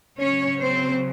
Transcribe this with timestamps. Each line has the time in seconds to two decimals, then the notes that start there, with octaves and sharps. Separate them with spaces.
0.19 C#3 F#3 C#4 C#5
0.61 C4 C5